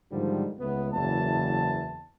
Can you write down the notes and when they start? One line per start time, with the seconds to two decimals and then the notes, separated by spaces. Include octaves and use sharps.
0.11 G#2 D3 D#3 F3 G3
0.59 C#2 A3 B3
0.93 F#1 E2 E3 A5